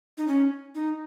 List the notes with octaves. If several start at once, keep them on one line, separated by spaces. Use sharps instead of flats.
D#4
C#4
D#4